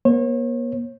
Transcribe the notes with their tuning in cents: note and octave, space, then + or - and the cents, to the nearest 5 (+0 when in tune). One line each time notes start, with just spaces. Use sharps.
A#3 +45 C#5 -40